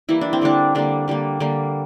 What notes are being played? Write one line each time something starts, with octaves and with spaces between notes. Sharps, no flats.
E3 G3 A#3 E4
D4
C4
D3 G3 A#3 D4
D3 G3 A#3 D4
D3 G3 A#3
D3 G3 A#3